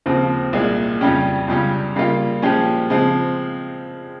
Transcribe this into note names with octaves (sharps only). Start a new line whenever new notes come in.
D#2 C#3 F3 C4
C2 A#2 G#3
F2 C#3 G3 C#4 G4
C#2 C#3 G3 C#4
C#3 G3 A#3 F4
A#2 F3 G#3 C#4 G4
C#3 F3 G#3 C4